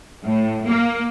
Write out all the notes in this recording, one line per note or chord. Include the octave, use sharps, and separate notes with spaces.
A2
A#3